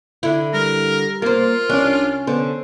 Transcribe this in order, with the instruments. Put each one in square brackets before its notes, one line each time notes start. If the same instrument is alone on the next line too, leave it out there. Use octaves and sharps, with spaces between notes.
[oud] D3 E4
[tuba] G3 [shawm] A#4
[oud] A#3 C5 [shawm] F4 [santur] A#4
[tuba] C2 [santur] C#4 A5 [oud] D4
[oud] D3 [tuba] B3 [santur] C5